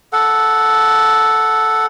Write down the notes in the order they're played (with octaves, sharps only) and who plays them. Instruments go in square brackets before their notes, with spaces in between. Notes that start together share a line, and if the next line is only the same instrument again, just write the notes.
[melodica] A4 F#5